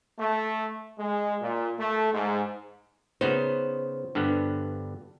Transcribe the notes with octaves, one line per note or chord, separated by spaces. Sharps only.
A3
G#3
A#2
A3
G#2
C#3 B3 D#4 C5
G2 D3 B3